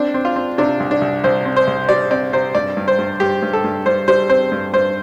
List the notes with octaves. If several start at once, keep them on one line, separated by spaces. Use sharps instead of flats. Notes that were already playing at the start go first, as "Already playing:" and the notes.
Already playing: C4 D4
C4
F4
C4
C3 D4
C2
D4
C2
C2 C5
C4
C5
C2
G3 D5
C4 D5
C3 C5
G2 D5
G2
C5
G2
G2 G4
G2
A4
G2
G2 C5
G3 C5
C4 C5
G2
G2 C5